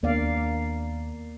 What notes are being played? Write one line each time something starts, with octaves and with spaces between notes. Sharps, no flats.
D#2 A#3 B3 D4 D5 F5